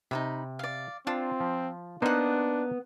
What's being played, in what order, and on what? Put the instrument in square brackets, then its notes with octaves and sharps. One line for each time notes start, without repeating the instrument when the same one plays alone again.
[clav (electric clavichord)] C3 [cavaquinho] D#4 F#4 B5
[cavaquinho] D5 F5
[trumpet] C4 [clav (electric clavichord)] D4 A5 [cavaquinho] F4
[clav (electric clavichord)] F3
[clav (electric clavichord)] A#3 D#4 C5 [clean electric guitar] B3 [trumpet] D4 [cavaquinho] F#5 C6